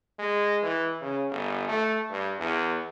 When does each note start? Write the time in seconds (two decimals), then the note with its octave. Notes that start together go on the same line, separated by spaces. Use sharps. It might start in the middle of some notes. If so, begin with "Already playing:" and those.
0.19 G#3
0.63 E3
1.02 C#3
1.31 G1
1.68 A3
2.11 G2
2.39 E2